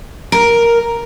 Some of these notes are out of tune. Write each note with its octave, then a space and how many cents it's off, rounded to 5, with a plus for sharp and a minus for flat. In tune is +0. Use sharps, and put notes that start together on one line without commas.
A#4 +5